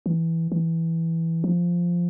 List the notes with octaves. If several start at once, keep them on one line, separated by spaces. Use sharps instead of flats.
E3
E3
F3